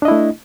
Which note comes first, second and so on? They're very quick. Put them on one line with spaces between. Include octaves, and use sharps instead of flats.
D4 D#5 E4 A3